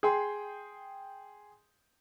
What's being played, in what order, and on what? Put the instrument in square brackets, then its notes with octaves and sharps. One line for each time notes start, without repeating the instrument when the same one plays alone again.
[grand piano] G#4 G5 C6